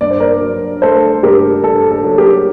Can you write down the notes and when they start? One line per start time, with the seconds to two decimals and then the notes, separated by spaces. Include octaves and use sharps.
0.01 G2 D5
0.11 C5
0.20 A#4 D5
0.41 F#3
0.82 A3 A4 C5
1.23 G2 G4 A#4
1.63 G2 A4
1.91 A4
2.04 F#3
2.18 G4 A#4